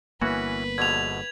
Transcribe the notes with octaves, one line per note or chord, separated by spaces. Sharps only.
G1 E3 A#3 B3 C#4 F#4 B4
A#1 B2 D3 G#6 F7